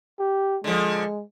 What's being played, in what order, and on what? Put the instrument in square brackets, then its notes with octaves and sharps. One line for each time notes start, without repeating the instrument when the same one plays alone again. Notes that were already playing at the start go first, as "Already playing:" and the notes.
[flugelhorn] G4
[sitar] D3 F3 [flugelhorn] G#3